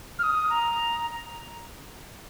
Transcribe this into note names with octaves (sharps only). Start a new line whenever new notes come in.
F6
D#6
A#5